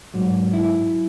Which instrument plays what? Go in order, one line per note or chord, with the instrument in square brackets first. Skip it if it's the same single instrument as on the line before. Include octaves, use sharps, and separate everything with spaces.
[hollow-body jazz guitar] G#2 [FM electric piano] F#3
[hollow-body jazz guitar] E4